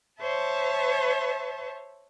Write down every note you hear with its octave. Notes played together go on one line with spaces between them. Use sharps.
C5 C#5 E5 A5